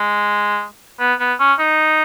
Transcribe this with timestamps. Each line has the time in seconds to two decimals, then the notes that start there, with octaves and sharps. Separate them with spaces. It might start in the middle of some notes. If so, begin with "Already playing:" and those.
Already playing: G#3
1.00 B3
1.20 B3
1.39 C#4
1.59 D#4